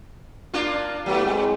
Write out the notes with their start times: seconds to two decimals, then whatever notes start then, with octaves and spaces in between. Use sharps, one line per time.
0.54 A#3 D4 F4
1.06 G#2 F#3 A3 B3 G4
1.23 G#3 C4